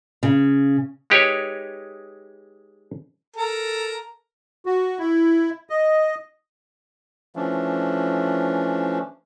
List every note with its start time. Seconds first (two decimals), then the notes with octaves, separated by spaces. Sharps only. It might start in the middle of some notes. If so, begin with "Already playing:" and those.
0.23 C#3
1.10 G#3 D#4 G4 B4 C#5
3.36 A4 A#4
4.66 F#4
4.99 E4
5.70 D#5
7.36 E3 F3 A3 C#4 D4